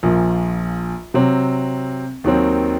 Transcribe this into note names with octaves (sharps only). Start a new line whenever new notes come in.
A#1 A#2 F3
C3 F#3 C4
D#2 D#3 F#3 C4